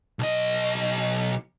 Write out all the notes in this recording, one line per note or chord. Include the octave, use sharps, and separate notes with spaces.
B1 D#5